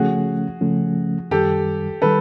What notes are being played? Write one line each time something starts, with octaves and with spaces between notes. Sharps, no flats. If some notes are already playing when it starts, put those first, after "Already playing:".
Already playing: C#3 F3 A3 C#4 F#4 G#4
C#3 F3 A3 C#4
F#2 D#3 G3 G4 A4
D#3 G3 A4 B4